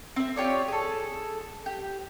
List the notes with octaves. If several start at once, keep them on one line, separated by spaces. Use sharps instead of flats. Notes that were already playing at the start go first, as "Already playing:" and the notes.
C4 E5
F4 G4 C#5 D5
G#4 A4
G4